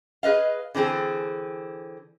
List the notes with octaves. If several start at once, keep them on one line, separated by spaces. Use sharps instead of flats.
G#4 B4 D#5 F5
D3 E3 C4 G#4